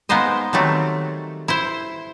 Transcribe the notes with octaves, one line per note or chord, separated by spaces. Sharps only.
G#3 A#3 B3 D#4 C5 D#5
D#3 F#3 G3 A3 C4
E4 C5